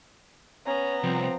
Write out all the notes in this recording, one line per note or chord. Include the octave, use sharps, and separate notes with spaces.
B3 C#4 A#5
C2 F3 C4